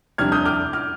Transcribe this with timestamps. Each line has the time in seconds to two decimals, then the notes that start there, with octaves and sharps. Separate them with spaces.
0.18 F2 C3 G3 D4 F6 G#6
0.32 D#6 G6
0.45 D6 F6
0.73 D6 F6